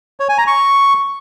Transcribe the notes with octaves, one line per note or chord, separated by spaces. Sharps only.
C#5
G#5
A#5
C#6